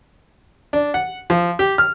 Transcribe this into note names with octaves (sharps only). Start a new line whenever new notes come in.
D4
F#5
F3
G4
F6